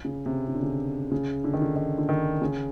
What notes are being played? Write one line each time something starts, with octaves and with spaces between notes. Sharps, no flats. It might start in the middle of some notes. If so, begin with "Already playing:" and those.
C#3
C3
C#3
D3
C#3
C#3
D3
D#3
D3
D#3
D3
D#3
C#3